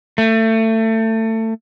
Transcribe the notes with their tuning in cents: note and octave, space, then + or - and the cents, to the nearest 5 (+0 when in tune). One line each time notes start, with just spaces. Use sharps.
A3 +25